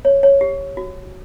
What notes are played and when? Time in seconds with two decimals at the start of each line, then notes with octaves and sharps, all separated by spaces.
0.05 C#5
0.23 C#5
0.41 G4
0.77 F#4